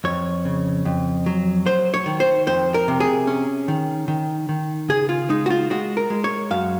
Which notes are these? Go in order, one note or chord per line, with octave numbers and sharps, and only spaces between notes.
F2 C#5
C#3
F2
F#3
F#3 C5
C#5
D#3
C5
F2 C5
A#4
C3
G#4
C#4
D#3
D#3
D#3
C#3 G#4
F4
G#3 D#4
F#4
F4
G#3 F#4
A#4
G#3
C#5
F#2 F5